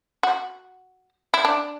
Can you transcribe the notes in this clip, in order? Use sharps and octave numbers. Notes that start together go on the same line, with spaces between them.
F#4
E4
D4